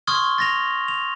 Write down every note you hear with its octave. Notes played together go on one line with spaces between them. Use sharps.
C6 C#6 D#6 F6 G#6 G7
A6 A#6 F7
F7